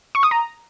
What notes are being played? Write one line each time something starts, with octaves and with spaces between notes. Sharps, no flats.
C#6
D#6
A#5